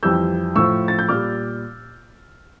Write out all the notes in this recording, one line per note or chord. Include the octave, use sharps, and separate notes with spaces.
F2 E3 G3 E6 G6
A2 F3 C#6 E6
A6
G6
A#2 G3 D6 F6